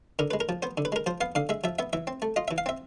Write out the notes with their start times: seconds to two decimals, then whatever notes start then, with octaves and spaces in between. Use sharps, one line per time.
0.19 D3 A#4
0.31 B4
0.33 G#3
0.40 A#4
0.49 F3
0.62 B3 C5
0.78 D3
0.85 B4
0.92 G#3 A#4
1.06 F3 C5
1.21 B3 F5
1.35 D3 F5
1.49 G#3 E5
1.64 F3 E5
1.79 B3 E5
1.93 E3 E5
2.07 C4
2.22 A3
2.36 F4 D#5
2.48 E5
2.51 E3
2.58 F5
2.66 C4 E5